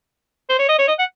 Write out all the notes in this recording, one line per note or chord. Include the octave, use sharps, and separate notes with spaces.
C5
C#5
D#5
C#5
D#5
F#5